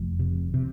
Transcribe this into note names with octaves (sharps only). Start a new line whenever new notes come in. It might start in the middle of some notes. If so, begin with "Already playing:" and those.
Already playing: F1 F3
C3
C3